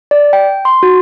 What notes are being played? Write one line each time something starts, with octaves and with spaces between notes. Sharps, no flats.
D5
G5
C6
F#4